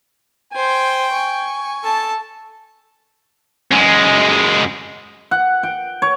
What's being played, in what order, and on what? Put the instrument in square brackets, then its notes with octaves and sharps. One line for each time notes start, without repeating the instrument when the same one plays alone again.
[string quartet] C5 G#5 [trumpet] G5
[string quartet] G#5 C#6
[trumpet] A4 [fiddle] A5
[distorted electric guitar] F#2 G#3
[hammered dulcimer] F#5
G5
C#5